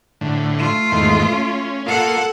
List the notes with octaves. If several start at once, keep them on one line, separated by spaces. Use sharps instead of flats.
A2 D3
A3 F4
E2 G#2 D#3
C#4
A#3 F4 A4 F#5